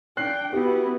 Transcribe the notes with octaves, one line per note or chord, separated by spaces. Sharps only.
D4 G5 F#6 C7
B3 E4 F#4 G4